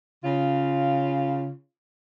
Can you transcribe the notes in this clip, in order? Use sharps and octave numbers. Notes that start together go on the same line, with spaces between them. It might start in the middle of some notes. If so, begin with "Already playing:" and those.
C#3 F4